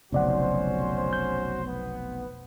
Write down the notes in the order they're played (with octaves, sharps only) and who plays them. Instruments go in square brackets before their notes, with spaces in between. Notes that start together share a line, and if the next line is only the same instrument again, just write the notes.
[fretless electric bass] F1 B1 [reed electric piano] C#3 D5 F#5 [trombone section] C#4 F#4 C5
[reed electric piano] G6
[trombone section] B3